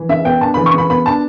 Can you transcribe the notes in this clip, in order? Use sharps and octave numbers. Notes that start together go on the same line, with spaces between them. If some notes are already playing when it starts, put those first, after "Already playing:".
Already playing: E3
C#3 E5
B3 G5
D4 A5
E3 B5
C#6
C#3 B5
B3 B5
D4 A5